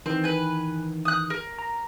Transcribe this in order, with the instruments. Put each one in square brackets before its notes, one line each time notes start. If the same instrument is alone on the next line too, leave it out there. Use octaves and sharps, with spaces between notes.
[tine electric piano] D#3 E3 [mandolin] C4
[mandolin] B4 G#5
D#6 F#6
A#4
[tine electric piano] A#5